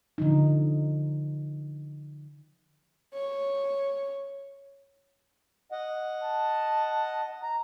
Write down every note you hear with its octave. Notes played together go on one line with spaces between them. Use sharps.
D3 F3 D#4
C#5
D#5 F#5
A5
A#5